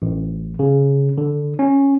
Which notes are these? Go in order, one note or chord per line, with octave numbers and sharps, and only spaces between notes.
A1
C#3
D3
C#4